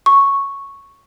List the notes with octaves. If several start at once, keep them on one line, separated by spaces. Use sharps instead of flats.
C#6